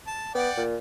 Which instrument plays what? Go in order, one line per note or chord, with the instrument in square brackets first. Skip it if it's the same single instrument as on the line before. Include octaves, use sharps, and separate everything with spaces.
[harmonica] A5
[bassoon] B3 [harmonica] D5 F#5 G5
[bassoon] A#2